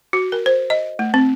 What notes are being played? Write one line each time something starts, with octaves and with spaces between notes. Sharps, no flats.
F#4
A#4
C5
D#5
A3
C4